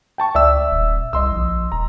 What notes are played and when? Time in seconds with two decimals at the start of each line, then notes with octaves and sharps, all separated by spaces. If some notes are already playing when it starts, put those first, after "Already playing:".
0.18 G5 A5 C#6
0.35 C#2 D5 E5 E6
0.71 D#1
1.13 C2 D#5 C6 E6
1.32 A#1
1.72 E1 A#5